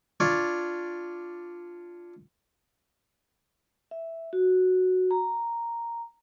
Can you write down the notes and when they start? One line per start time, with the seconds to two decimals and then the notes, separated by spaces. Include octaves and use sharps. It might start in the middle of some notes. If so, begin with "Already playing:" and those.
0.20 D4 F4 C#5 D5
3.91 E5
4.33 F#4
5.11 A#5